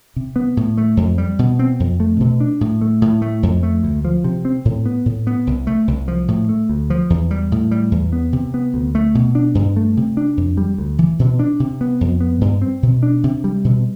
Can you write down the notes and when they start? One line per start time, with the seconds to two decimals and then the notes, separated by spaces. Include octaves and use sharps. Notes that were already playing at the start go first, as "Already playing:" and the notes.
0.16 C3
0.36 B3
0.57 A2
0.77 A3
0.97 F2
1.18 G3
1.39 B2
1.59 C4
1.80 F2
2.00 A3
2.20 B2
2.40 D4
2.61 A2
2.81 A3
3.02 A2
3.22 A3
3.43 F2
3.63 A3
3.83 D2
4.05 F3
4.24 C3
4.45 C4
4.65 A2
4.86 B3
5.06 A2
5.27 B3
5.47 C2
5.67 A3
5.88 C2
6.08 F3
6.28 A2
6.49 A3
6.69 D2
6.90 F3
7.10 E2
7.31 G3
7.52 A2
7.71 G3
7.92 E2
8.13 B3
8.33 C3
8.54 B3
8.74 D2
8.95 A3
9.15 B2
9.35 D4
9.55 G2
9.77 A3
9.97 C3
10.17 D4
10.37 F2
10.57 G3
10.78 D2
10.99 E3
11.19 B2
11.39 D4
11.60 C3
11.81 B3
12.01 F2
12.21 B3
12.41 G2
12.62 C4
12.83 B2
13.03 D4
13.24 C3
13.44 G3
13.65 B2